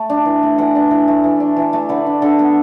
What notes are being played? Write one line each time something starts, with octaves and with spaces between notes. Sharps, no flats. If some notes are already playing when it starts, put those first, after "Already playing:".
Already playing: A3 A5
D4
E3
A3
E3 F#5
D4
E3
A3
E3
D4
E3
A3
D3 B4
D4
D3 A4
B3